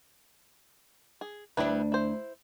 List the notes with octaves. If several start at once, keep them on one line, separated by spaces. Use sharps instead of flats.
G#4
D2 G3 D4 E4 B4
E4 C5